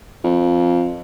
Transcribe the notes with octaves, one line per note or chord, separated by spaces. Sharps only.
F2